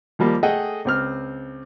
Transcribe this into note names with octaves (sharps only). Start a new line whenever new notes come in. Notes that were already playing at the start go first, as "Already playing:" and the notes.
D#2 F3 G3 A#3
A3 G#4 A4 D#5 F#5 G5
C#2 C4 F6